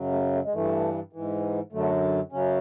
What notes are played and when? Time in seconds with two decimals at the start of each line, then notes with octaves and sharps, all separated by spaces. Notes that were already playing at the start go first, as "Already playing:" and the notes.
Already playing: F#2 C#3 F#3
0.12 A3
0.32 A3
0.44 G#3
0.53 G2 E3 A3
1.13 G#2 E3
1.72 F#2 D3 F#3 A3
2.32 F#2 C#3 F#3 C#4